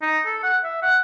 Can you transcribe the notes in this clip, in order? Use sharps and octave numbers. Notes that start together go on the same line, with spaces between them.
D#4
A4
F#5
E5
F#5